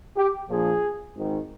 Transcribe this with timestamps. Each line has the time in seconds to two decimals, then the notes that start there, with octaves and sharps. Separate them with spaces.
0.16 G4
0.49 A#1 A#2 F3 G#4
1.14 G#1 G#2 D#3